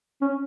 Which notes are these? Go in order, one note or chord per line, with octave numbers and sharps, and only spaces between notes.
C#4